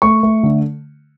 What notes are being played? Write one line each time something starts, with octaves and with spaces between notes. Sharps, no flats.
A3 C#6
A3
D3